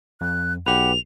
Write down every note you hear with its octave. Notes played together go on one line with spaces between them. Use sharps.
F2 F#6
B1 G4 B4 F#5 F7